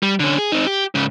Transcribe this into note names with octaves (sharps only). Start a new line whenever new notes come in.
G3
D3 C#4
G#4
C4 D#4
G4
G#2 C#3